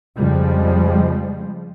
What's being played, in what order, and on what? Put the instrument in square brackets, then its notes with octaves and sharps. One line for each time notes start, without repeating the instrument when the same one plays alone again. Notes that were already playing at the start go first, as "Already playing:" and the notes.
[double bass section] F2 C#3 F3 G3 G#3